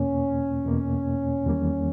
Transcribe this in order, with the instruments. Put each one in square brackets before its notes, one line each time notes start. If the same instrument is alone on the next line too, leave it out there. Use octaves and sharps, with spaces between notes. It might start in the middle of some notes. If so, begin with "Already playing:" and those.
Already playing: [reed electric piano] E2 B2 A#3 [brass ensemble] C#4
[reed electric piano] E2 B2 A#3
E2 D#3 G3 A#3